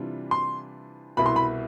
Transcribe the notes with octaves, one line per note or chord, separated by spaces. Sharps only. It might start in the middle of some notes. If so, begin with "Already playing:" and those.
Already playing: C3 E3 G3 D4 F4
C6
C2 B2 B3 E4 B5
C6
B5